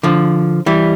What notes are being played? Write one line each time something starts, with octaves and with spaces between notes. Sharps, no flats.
D3 F3
E3 G3